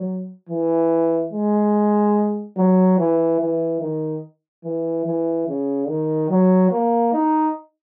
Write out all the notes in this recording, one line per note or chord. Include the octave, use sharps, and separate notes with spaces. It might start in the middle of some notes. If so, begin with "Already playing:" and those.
Already playing: F#3
E3
G#3
F#3
E3
E3
D#3
E3
E3
C#3
D#3
F#3
A#3
D#4